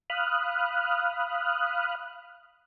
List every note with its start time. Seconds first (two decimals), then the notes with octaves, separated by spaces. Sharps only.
0.10 F5 B5 D#6 F6 F#6